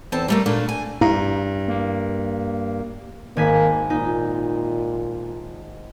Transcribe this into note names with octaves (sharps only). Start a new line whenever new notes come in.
E2 C4 A4 A5
G3 A3 A#3
A#2 A3 A#3 D4
G#5
G2 E4 F5 A#5
A#3
G#1 A#3 G#5 B6
A#2 D#4